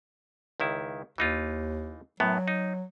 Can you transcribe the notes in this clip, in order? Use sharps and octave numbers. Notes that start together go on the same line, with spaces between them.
C#2 D#3 E4
D#2 E3 D#4 F4
F#2 A2 F#3 B3
D#4